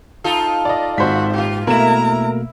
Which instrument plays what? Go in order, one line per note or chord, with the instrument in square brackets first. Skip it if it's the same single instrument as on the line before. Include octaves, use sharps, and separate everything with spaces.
[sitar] D#4 F4 A4
[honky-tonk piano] D5 D#5
[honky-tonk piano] G#1 C5 B6 [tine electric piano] G#2 [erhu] F#4
[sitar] A#2 F4 [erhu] G4
[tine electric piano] B2 A3 A#3 [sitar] E4 [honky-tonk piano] A#4 E7 [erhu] A#5